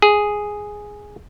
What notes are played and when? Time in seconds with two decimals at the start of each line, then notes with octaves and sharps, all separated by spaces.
0.02 G#4